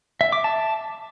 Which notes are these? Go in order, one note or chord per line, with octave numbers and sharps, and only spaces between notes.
E5
D6
A5